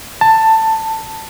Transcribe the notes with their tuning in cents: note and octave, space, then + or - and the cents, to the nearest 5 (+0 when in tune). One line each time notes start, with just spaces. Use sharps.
A5 +15